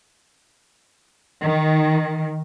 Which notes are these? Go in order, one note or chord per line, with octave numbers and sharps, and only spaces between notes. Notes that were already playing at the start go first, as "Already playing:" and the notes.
D#3